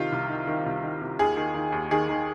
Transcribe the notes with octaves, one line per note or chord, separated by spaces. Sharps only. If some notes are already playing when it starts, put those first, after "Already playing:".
Already playing: C3 D#3 F4
C2
D#3
D#3
C2
D#3
C3
D#2 G#4
D#3
D#3
D#2
D#3 G#4
D#3